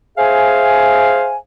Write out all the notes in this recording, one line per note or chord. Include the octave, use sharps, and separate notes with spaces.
G#4 C5 E5 F5 G#5